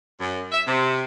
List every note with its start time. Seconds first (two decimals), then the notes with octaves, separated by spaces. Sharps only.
0.20 F#2
0.52 E5
0.67 C3